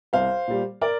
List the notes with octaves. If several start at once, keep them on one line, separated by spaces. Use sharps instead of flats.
C2 C5 F5
A#2 G3
A#4 D5